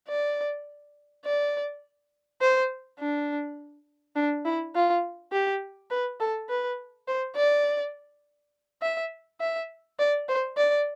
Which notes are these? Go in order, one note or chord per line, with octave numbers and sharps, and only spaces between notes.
D5
D5
C5
D4
D4
E4
F4
G4
B4
A4
B4
C5
D5
E5
E5
D5
C5
D5